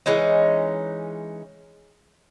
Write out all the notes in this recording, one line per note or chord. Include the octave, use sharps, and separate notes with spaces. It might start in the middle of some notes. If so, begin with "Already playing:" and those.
E3 G#3 C#4 D#4